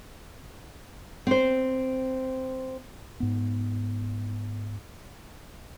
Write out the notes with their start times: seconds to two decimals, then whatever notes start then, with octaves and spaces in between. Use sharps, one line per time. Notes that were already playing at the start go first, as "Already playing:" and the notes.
1.27 C4 C5
3.20 G#2 B3